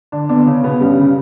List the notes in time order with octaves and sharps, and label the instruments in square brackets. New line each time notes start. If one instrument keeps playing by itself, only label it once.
[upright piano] D3 D4
[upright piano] D3 D4 [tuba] B3
[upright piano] C#3 C#4
B2 B3
[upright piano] G2 G3 [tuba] C#4
[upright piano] C#3